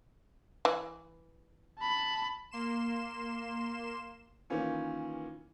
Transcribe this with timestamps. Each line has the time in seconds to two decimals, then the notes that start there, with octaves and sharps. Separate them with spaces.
0.65 E3
1.79 A5 B5
2.51 A#3 C6 E7
4.50 D#3 E3 A#3 B3 C#4 F4